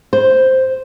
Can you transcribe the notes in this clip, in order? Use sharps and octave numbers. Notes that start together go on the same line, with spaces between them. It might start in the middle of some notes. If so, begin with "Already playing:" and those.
C5